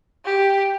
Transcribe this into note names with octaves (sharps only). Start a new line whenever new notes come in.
G4